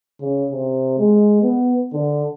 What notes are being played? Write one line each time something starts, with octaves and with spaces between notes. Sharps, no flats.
C#3
C3
G#3
B3
D3